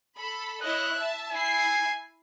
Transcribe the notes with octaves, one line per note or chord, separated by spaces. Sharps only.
A4 B5
E4 C#5 D#5 F#6
E5 A5
E4 G#5 C7